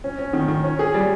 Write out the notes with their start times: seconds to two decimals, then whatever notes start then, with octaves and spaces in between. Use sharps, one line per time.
0.04 C#4
0.19 C#4
0.33 D#3
0.48 D#3
0.63 C#4
0.79 G#4
0.94 G3